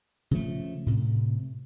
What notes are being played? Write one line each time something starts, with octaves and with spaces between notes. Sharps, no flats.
C#3 F3 A3
A2 C3